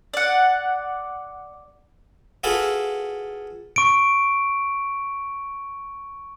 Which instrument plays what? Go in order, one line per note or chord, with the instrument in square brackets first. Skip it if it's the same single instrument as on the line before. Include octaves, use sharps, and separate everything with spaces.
[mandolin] D5 F#5
[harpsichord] F4 F#4 G#4 A4 B4
[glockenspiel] C#6 D7